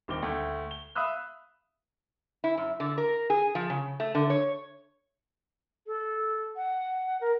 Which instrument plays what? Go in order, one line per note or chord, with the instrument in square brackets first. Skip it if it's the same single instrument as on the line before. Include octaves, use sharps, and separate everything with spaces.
[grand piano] D#1 D#3 C4 D6 G7
D2 A3 G5
G7
E5 F5 B5 D#6 E6 F#6
[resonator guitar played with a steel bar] E4
F#2
D3
A#4
G#4
F3
C#3
A3
D3
C#5
[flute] A4
F#5
A#4